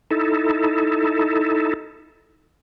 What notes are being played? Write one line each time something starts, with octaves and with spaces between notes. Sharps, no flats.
D#4 E4 A4